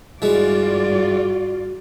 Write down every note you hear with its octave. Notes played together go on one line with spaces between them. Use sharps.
G2 E3 G#3 F4 F#4 D5